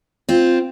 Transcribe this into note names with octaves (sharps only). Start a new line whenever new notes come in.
C4 F4